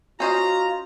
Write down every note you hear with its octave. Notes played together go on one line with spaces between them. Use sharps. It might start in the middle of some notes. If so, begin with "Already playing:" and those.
C#4 F4 F#4 C5 D#5 A#5